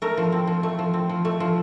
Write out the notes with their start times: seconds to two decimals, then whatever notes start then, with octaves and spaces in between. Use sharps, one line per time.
0.02 A3 A#4
0.17 F3
0.32 C4
0.47 F3
0.63 A3
0.79 F3
0.94 C4
1.09 F3
1.25 A3
1.40 F3